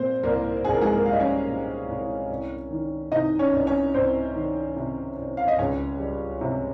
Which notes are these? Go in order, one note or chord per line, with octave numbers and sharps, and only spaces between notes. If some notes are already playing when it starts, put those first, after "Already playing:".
Already playing: A#2 G3 C4 C5
C2 A#3 A#4
C2 G#4
A#4
G#3 G#4
A#3 A#4
G3 F5
D#5
C#4 C#5
A#2
C2
C2
D#3
C3 D#4 D#5
C#4 C#5
C2
C#4 C#5
C2 C4 C5
D#3
C3
C2
F5
D#5
C#2 C#4 C#5
G3
C3